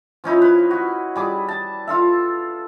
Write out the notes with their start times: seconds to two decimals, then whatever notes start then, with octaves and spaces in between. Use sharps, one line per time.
0.24 F3 C#4 D#4 E4
0.42 B4
0.71 F#4
1.16 G3 G#4 D6
1.48 A5
1.87 F4 A4 E5